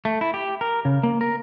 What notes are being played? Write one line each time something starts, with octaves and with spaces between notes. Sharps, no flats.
A3
E4
G4
A#4
C#3
A#3
A#4